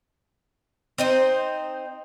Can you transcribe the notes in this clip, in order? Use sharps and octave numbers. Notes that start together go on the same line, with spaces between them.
C4 D#4 C5